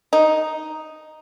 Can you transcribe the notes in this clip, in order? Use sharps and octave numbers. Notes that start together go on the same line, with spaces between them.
D#4